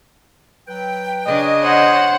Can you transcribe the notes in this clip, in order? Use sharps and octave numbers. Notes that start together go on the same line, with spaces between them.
F#3 B4 G5
C#3 D4 D#5
C5 C#5 F#5